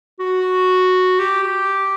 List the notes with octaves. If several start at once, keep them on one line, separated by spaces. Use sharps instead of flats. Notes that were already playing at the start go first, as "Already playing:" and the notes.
F#4
G4
G4